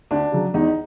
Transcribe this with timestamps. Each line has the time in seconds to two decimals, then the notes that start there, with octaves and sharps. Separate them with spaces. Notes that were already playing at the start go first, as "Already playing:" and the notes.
0.11 D2 D4
0.32 C#3 F#3
0.54 E2 D#4